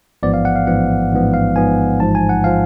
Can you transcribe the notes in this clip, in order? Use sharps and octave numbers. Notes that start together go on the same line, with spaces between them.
A1 G#2 F3 B3 D5
F5
F#5
F5
A1 G#2 F3 B3 F#5
A1 G#2 F3 B3
F5
A1 G#2 F3 B3 G#5
A1 G#2 F3 A5
G#5
F#5
F3 F5